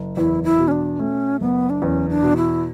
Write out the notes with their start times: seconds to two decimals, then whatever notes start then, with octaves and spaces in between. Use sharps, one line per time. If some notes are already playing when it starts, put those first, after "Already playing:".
Already playing: F#1
0.17 E2 E4
0.44 E4
0.59 B2
0.68 C#4
0.71 D4
0.99 A3 C#4
1.41 F#1 B3
1.70 D4
1.82 E2 C#4
2.09 D4
2.22 B2
2.37 E4